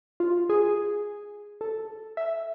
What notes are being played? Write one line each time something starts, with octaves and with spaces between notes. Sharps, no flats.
F4
G#4
A4
E5